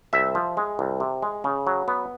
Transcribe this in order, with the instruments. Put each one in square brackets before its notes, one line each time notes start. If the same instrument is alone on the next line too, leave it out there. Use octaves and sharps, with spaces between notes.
[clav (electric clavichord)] C2 E5
F3
G#3
C2
C3
G#3
C#3
F#3
B3